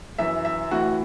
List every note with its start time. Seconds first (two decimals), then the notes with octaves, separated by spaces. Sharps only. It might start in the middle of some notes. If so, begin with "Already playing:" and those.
0.18 F#2 E3 E5
0.45 E5
0.71 A2 E3 F#4